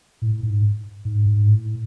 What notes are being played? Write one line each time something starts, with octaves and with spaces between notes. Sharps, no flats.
A2
G#2
G#2
G#2
A2